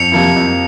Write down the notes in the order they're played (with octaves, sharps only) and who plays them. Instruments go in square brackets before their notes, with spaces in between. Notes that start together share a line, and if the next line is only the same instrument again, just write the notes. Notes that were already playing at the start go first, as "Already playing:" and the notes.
Already playing: [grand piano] F2 [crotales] C#7 F7
[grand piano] C3 F3 A#3 E4
F2